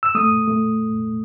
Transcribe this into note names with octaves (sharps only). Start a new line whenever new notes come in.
E6
A3 D#6
A3